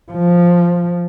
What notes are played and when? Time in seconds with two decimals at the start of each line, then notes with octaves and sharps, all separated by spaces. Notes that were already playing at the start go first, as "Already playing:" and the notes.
0.12 F3